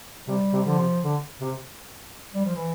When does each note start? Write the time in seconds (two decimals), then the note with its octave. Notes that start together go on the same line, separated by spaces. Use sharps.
0.27 C3 G3
0.53 C3
0.65 D3 F3
0.78 C3
1.03 D3
1.40 C3
2.35 G3
2.45 F3
2.55 E3